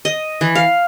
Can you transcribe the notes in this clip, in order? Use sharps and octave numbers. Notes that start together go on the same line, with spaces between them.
D#5
E3
F5